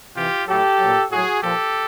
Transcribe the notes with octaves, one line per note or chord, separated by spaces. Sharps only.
C3 E3 F4 G4
A2 F#3 G4 A4
A#2 F#3
A2 F#3 F#4 G#4
A#2 F3 G4 A4